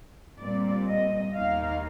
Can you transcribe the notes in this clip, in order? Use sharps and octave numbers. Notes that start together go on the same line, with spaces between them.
A#2 G3 C4 D5
D#5
D#2 D#3 A#3 D#4 F5